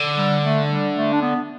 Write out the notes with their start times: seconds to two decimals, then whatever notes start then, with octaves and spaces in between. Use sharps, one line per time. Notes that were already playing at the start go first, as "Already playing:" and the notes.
Already playing: D3
0.17 G3
0.43 A3
0.70 G3
0.96 A3
1.13 D4
1.22 B3